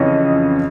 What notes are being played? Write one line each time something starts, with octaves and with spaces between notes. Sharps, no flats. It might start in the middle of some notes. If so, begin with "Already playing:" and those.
Already playing: F2 C#3 E3 C#5 D#5